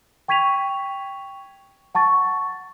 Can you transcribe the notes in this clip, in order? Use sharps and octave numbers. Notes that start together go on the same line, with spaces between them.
G5 C#6 G#6 B6 D#7 F7
F#5 A5 C#6 A6